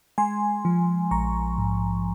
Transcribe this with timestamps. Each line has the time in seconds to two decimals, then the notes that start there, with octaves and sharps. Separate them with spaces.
0.18 G#3 G#5 C6
0.65 F3
1.11 A#1 A#5 C#6
1.58 G#2